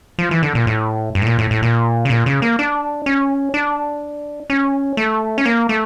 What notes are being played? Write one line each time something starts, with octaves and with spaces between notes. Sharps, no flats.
F3
E3
D3
A#2
A2
G2
A2
A#2
A2
A2
A#2
C#3
A#2
C#3
A#3
D4
C#4
D4
C#4
A3
C#4
A#3
A3